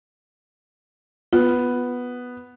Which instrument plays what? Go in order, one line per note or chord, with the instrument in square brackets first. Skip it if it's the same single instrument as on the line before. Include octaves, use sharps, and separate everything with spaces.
[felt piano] B3 [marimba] F4